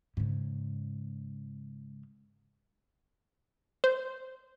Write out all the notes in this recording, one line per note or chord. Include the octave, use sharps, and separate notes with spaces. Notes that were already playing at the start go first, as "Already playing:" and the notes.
G#2 C#3
C5